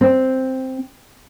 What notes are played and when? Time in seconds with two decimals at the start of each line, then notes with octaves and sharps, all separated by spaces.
0.01 C4